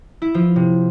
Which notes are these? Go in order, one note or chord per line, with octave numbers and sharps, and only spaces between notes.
E4
F3 F4
C3